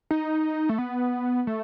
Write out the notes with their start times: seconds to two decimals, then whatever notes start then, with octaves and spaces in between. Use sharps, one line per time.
0.11 D#4
0.69 A3
0.78 B3
1.47 A3